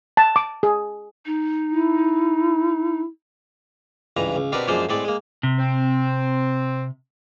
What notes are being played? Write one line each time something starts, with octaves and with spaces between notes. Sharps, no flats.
A5
D6
G#4
D#4
E4
C#2 G2 E3 A#5
C#2
B2 C4 D4 G4 A#4 B4
F#2 F3 G#3 A#3 D4 C5
A2 G#3 C4 D5
G#3 A#3
C3
C4